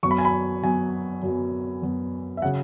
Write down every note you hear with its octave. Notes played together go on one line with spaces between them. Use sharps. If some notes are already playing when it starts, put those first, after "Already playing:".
F#2 F#3 B3 C#6
B5
G#5
B5
F#2 F#3 B3 G#5
F#2 F#3 B3
F#2 F#3 B3
E5
C#3 F#3 F#5